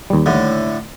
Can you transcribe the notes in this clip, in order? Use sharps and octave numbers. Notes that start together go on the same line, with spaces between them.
D#2 G3
A2 D3